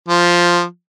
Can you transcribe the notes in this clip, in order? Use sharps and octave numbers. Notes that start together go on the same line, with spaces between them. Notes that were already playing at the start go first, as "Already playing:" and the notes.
F3